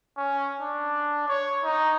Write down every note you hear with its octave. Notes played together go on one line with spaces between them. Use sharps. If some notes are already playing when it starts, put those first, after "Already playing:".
C#4
D4
C#5
D#4